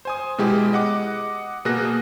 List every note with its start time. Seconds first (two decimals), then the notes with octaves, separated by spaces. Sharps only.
0.05 C5 G#5 D#6
0.38 B2 G#3 E4 G4 G#4
0.73 D#5 F#5 D6
1.65 B2 A#3 G#4 F#6 A#6